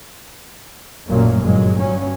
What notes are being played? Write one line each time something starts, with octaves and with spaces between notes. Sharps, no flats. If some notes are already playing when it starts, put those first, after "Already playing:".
A1 F#2 A#2 F#3 A3 A#3
G1 A#2 F#3 G#3
G2 F#3 C#4